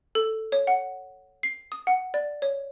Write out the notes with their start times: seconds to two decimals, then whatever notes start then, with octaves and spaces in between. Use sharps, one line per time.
0.15 A4
0.52 C#5
0.67 F#5
1.43 C7
1.72 D#6
1.87 F#5
2.14 D5
2.42 C#5